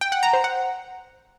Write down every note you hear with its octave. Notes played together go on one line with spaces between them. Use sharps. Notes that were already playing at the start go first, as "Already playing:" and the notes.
G5
F#5
A#5
C5
F#5